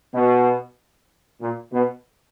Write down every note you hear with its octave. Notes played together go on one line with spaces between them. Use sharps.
B2
A#2
B2